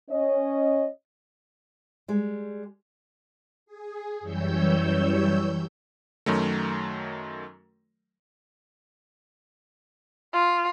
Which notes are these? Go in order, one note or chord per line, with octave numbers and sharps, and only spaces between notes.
C#4 C#5 D#5
G3 G#3
G#4
F#2 E3 G3 C#5 E6 G6
F#2 D#3 F#3 A3
F4